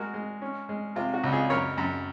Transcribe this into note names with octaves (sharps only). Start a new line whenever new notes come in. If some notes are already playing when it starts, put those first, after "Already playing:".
Already playing: G#3 F#4 A#4
G#3
C#4
G#3
C3 F4
F#4
C#2
F4 G#4
F#2 A#4 C#5
F#2